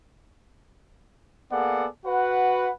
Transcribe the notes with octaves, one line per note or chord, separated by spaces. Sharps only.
A#3 B3 G#4 A4 D5 F#5
F#4 B4 F#5